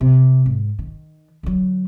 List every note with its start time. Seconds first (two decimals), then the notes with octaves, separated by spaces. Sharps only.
0.01 C3
0.46 G#2
0.79 D#3
1.43 D3 F#3